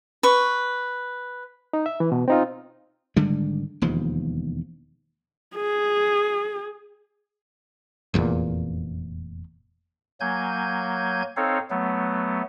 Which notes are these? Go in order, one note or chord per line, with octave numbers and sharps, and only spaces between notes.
B4 C#6
D#4
E5
E3
B2
C4 D#4 F4
G#1 D3 G3 G#3
E1 D#2 F3
G#4
F1 E2 A#2
F#3 A#3 G#5 G6 G#6
C4 D#4 A4 C#5 F5
F#3 A3 B3